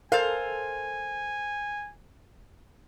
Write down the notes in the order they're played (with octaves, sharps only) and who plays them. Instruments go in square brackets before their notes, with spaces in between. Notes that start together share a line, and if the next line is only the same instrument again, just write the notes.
[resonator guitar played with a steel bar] A4 C5 F5 [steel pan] A#4 [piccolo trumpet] G#5